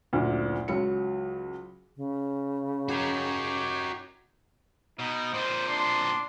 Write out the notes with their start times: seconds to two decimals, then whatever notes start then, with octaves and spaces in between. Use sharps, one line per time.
0.13 F#1 D2 A#2
0.68 C#2 F#3 C#7
1.95 C#3
2.89 D#4 F#4 G4 A#4 C#5
4.99 B2 D#4
5.34 A#2 C4 C5
5.68 D4 C6